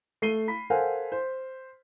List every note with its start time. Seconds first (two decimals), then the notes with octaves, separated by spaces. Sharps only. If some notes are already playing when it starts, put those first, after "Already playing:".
0.22 A3 C7 D#7 G7
0.48 B5 B6
0.70 A4 A#4 C5 F5 F#5 G#5
1.12 C5